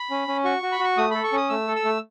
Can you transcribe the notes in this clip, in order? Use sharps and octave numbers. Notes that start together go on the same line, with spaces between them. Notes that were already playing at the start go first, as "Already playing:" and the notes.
Already playing: B5
C#4
C#4
F#4 C#6
F#4
B5
F#4 C#6
A3 D#6
A4 B5
C#6
C#4 D#6
A3 E6
A4
E6
A3